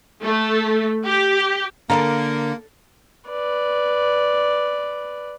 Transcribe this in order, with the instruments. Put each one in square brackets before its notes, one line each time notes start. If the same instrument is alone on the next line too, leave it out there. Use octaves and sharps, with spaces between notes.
[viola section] A3
G4
[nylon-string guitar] D3 [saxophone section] A#3 [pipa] A4 F5 A#5
[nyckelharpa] B4 D5